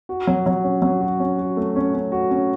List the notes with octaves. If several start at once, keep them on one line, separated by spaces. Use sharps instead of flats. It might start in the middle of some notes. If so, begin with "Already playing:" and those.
F#4
F#3
F#3
C#4
F#3
F#4
C#4
F#4
A3
C#4
C#4
F#4
C#4